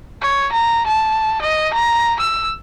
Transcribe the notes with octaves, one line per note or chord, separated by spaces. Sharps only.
C#5
A#5
A5
D#5
A#5
E6